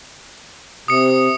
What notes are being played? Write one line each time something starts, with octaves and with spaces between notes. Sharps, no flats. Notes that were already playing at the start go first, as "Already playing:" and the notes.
C3 D#6 C#7